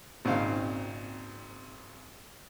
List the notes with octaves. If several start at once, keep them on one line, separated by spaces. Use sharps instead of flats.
G#1 A#2 C#3 C4 D#4 F5